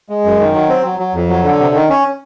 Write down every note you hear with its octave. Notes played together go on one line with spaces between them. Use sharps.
G#3
F#2
D#3
F#3
C4
F#3
F#3
F2
F#3
D3
C3
D#3
C#4